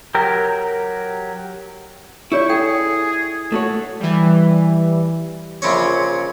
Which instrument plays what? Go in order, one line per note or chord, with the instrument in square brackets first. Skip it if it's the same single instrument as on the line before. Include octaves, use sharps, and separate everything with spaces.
[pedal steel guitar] F#3 G4 A#4
[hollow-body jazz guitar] E4 [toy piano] G4 C#5 D5 [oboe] C#6
[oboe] G#4 [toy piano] A4 G5
[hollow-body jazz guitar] A3 F#4 C#5
[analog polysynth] E3 G3
[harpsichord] A#1 C#3 C4 C#4 C#5